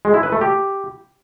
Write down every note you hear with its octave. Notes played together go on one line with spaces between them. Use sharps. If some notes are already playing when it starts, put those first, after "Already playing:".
G#3
E4
B4
A3
G4